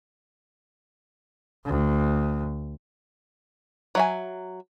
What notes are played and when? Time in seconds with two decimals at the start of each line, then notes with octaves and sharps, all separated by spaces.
1.65 D2
3.95 F#3 E5 G#5